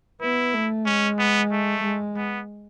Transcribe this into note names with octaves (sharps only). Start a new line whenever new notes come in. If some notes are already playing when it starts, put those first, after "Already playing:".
B3 E4
A3
G#3 C#4
B3
A3
G#3
B3